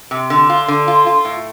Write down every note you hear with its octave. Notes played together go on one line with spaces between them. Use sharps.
C3
D3
F4
D3
F4
F4
A2